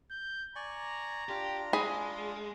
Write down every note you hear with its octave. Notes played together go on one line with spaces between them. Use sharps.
G6
D5 G#5 A#5 C#6
D4 F4 G4
G#3 G#4 B5